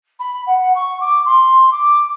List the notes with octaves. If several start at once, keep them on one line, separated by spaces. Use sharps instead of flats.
B5
F#5
C#6
D6
C6
D6